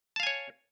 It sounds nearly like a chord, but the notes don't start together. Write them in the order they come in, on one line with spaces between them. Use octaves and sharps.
A5 F5 G#5 C#5